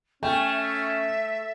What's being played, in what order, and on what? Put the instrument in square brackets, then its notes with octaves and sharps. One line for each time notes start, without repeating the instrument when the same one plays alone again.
[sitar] A3 [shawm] C#4 [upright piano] G5 [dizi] G#5
[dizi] E5